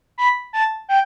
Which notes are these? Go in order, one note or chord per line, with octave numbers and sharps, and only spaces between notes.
B5
A5
G5